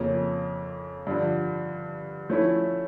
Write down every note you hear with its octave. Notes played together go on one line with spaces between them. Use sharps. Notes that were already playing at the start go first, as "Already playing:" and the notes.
Already playing: F2 C#3 F3 A#3 C#4
G2 D3 F3
F3 A3 C#4 E4